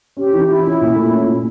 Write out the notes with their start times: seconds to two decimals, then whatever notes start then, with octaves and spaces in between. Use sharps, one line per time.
0.17 C#4 G4
0.33 E3
0.49 E4 F4
0.65 C#4
0.81 A#2
0.96 A3
1.12 C#4
1.28 A#2